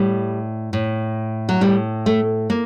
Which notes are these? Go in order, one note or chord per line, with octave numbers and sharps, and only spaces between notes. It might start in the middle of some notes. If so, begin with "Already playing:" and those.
Already playing: A2 G3
A2
F#3
A2 G3
A3
A#3